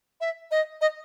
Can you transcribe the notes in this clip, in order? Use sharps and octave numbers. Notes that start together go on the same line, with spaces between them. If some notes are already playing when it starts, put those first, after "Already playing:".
E5
D#5
D#5